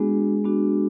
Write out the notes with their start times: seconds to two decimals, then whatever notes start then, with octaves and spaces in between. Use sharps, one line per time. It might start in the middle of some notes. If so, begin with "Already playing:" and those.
Already playing: G#3 B3 D4 F#4 G#4
0.45 B3 D4 F#4